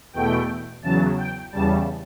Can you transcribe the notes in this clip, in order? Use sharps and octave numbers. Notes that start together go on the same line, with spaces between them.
E2 B2 A3 G5
E2 C#3 F#3 A5
G5
E2 C#3 G3 A5